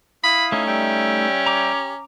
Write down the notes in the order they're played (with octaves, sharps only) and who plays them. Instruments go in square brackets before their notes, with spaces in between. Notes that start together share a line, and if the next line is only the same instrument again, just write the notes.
[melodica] E4 F5 D#6 [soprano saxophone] B5
[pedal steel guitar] A3 D#4 [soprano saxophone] C#4
[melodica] G3 E5 G5
[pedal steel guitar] A#5 D6
[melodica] G4